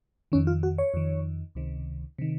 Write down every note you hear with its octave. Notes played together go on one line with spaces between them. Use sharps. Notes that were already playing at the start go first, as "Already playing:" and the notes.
F2 D#3 C#4
F4
F#4
C#5
F2 D#3
C#2 C3 D#3
C3 D#3